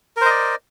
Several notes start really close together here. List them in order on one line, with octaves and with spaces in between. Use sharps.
A#4 C5 D#5 D5